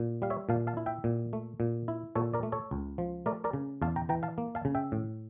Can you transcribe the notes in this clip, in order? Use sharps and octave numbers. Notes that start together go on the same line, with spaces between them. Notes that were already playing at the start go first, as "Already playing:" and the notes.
Already playing: A#2
G3 F5
C#5 E5
A#2 F5 A5
F5 A5
E4
E5 G5
A#2
A3
A#2
E4
A#2 A4 C#5
A#4 D5
A3
A4 C#5
C#2
F3
A3 A#4 D5
A#4 D5
C#3
E2 F5 A5
G5 A#5
E3 G5 A#5
F5 A5
A#3
F5 A5
C#3
E5 G5
A2